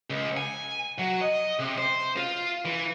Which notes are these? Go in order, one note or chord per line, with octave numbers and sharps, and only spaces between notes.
C#2
G#5
F#3
D#5
C3
C5
F4
E3